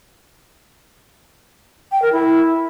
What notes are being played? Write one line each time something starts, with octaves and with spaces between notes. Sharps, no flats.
G5
A#4
E4